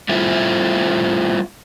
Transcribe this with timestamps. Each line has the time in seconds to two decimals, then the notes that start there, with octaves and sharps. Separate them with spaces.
0.09 G3 A3 C4 E4 F4